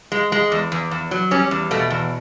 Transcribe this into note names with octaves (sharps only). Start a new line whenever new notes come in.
G#3
G#3
E2
E2
E2
F#3
G3 C#4
E2
B2 A3
E2